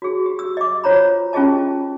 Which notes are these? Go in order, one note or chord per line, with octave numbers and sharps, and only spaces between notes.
F#4 G#4
G4
E6
D#5 D6
F4 C5 C#5 A#5 B5
C#4 F4 G4 G#4 D#5 A5